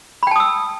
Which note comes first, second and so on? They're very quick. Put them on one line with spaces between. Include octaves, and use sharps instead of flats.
B5 G5 A5 D#6 E6